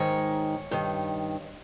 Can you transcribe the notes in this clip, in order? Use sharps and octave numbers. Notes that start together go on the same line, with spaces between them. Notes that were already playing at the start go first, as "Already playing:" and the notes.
Already playing: G#2 D#3 C#5
G2 D#3